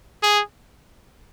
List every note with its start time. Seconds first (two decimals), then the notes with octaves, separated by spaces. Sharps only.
0.22 G#4